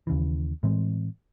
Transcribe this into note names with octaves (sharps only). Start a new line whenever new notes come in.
D#2 C#3 E3
A2 E3 G#3 C4